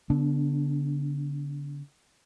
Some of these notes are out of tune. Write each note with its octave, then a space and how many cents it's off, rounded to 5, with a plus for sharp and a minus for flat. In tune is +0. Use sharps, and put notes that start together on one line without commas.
D3 -40 B3 +0 D4 +0